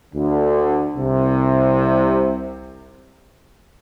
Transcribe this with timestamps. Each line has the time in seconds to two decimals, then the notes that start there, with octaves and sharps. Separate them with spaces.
0.14 D2 D3
0.97 C2 C3